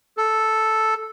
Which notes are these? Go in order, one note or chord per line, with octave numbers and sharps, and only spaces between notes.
A4